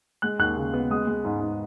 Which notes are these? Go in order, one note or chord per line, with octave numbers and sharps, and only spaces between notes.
G#3 F#6
D#2 F#6
C#3
B3
G#3 D#6
G#3
G#2
G#2